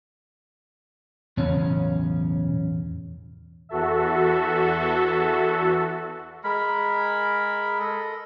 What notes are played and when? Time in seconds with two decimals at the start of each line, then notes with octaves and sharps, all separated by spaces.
1.37 B1 E2 A2 C#3 C#4
3.69 E2 F#4 A4 E5
6.44 G#3 A#4 B5
7.79 A4 D#5